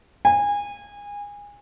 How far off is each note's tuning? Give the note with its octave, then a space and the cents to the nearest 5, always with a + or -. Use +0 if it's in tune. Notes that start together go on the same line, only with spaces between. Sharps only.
G#5 -25